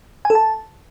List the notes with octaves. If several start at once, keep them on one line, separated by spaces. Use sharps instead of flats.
G#5
A4
A5